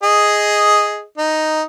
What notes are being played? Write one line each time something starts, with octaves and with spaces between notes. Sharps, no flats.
G#4 D#5
D#4